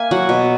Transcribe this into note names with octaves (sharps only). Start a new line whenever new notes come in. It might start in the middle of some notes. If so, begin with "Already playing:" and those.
Already playing: A#3 E5 G#5
F#3 F#5
B2